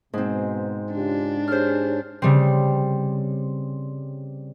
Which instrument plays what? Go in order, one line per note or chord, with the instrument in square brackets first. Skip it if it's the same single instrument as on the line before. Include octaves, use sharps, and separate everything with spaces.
[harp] G#2 C4 [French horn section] B2
[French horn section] C#3 F4 G4 [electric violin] D4
[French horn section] G4 G#4 C#5 [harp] C5 F6
[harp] C#3 G3 C4